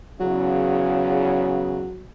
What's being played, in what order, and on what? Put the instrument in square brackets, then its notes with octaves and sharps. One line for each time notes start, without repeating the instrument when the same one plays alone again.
[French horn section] E2 C#3 [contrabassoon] F#3